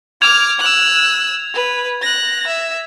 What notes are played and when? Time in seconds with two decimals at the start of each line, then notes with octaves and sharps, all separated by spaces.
0.22 D6 F6 G#6 F7
0.60 E6 F#6
1.54 B4
2.02 F#6 A#6
2.47 E5